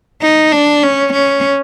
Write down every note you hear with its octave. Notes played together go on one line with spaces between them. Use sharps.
D#4
D4
C#4
C#4